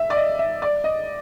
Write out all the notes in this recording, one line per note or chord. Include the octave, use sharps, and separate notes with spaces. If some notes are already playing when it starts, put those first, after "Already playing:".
Already playing: E5
D5
D#5
E5
D5
D#5